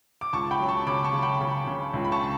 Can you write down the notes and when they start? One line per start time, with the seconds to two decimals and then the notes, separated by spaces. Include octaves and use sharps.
0.21 D6
0.33 C#2 A5 C#6
0.51 G5 B5
0.60 F#3
0.69 A5 C#6
0.86 C#3 B5 D6
1.04 A5 C#6
1.13 C#3
1.22 G5 B5
1.41 C#3
1.67 C#3
1.94 C#2
2.05 B5
2.12 A5 C#6